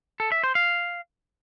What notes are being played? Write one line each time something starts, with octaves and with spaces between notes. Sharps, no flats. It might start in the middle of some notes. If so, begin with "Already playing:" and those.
A4
E5
C5
F5